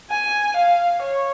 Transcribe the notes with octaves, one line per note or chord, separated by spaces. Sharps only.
G#5
F5
C#5